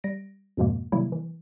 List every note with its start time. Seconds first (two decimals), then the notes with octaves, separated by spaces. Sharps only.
0.04 G3 A#6 D7
0.57 F2 G#2 B2 F3 G#3 A#3
0.92 C3 D#3 F#3 G3 A#3 E4
1.12 E3